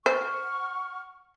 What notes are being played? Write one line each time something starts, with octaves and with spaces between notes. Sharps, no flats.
C5 F#5 C#6 F6